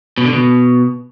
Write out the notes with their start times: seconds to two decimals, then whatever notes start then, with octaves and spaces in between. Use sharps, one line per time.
0.18 B2
0.25 D3
0.33 B2